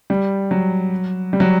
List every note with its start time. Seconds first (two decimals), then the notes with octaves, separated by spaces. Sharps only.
0.10 G3
0.51 F#3
1.33 G3
1.40 F#3